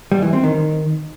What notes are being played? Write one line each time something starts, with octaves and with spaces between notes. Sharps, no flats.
G3
E3
C4
D#3